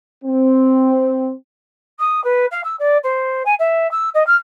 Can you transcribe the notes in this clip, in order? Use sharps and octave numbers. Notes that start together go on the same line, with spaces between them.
C4
D#6
B4
F5
E6
D5
C5
G#5
E5
E6
D#5
F6